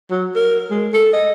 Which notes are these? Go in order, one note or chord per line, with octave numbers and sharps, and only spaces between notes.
F#3
A#4
G#3
A4
D#5